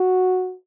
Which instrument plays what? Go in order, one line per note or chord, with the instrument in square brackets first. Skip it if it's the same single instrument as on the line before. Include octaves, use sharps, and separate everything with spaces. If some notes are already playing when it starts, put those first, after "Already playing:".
Already playing: [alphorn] F#4